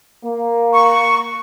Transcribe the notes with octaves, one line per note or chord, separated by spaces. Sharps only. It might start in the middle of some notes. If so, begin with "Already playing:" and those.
A#3
C#6